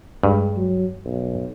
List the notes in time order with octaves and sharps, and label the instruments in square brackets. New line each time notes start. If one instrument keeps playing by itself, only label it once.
[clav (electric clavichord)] G2 [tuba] G#3
[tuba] F#3
B1